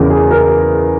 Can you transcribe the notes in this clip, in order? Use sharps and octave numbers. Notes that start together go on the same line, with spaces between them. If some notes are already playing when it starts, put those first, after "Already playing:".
Already playing: E2 C#3 E3 A#4
G#4
A#4